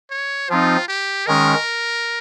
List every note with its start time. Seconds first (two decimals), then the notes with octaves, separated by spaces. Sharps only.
0.11 C#5
0.50 F3 C4 D#4 F4
0.89 G4
1.27 D#3 G#3 C#4 A#4